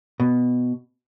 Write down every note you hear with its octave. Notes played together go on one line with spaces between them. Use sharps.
B2